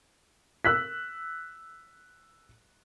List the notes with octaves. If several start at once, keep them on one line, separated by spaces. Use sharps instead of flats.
E6 F#6 B6